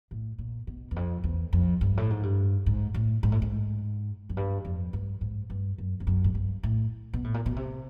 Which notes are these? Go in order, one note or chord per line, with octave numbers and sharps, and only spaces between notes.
A2
A#2
B2
E2
F2
E2
F2
G2
A2
G#2
G2
G#2
A2
G#2
A2
G#2
F#2
G2
F2
G2
G#2
G2
F#2
F2
F#2
G#2
G2
A2
B2
A2
A#2
B2
C3